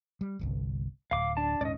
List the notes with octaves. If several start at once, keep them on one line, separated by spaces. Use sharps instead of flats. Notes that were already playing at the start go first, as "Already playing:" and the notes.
G3
D1 G1 C2
D1 F5 D6
D4 A5
D#1 G#2 C#4 D5 D#5